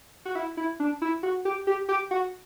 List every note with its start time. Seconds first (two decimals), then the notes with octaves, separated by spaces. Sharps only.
0.25 F#4
0.35 E4
0.57 E4
0.80 D4
1.02 E4
1.23 F#4
1.45 G4
1.67 G4
1.89 G4
2.11 F#4